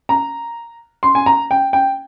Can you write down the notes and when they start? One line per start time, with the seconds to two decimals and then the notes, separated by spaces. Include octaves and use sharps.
0.09 A#5
1.03 C6
1.15 G#5
1.26 A#5
1.51 G5
1.73 G5